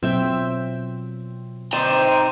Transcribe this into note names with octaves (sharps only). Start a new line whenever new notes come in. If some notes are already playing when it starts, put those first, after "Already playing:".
B2 F#3 C4 F4 E5 G5
C4 D#4 C5 D5 G5 A#5